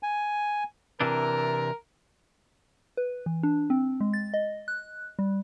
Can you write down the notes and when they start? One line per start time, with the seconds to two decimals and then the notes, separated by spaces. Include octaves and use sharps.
0.03 G#5
1.01 C3 E3 D4 A#4
2.97 B4
3.26 E3
3.43 D4
3.70 C4
4.00 G#3
4.13 A6
4.34 D#5
4.68 F#6
5.19 G3